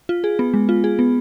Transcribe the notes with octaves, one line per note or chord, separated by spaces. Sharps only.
F4
G#4
B3
G#3
F4
G#4
B3